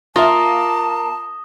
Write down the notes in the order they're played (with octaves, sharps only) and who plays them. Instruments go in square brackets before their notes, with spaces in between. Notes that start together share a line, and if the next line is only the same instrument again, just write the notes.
[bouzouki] A#3 [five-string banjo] F4 E5 [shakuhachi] A5 [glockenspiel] D#6 A#6 G7